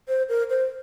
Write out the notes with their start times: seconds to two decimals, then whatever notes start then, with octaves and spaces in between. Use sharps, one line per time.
0.08 C5
0.29 A#4
0.50 C5